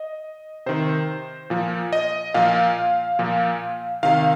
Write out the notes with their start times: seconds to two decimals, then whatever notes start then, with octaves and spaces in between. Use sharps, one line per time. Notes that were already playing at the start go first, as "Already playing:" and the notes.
Already playing: D#5
0.66 C3 D#3 C5
1.50 A#2 F3
1.93 D#5
2.34 A#2 F3 F5
3.19 A#2 F3
4.03 C3 D#3 F5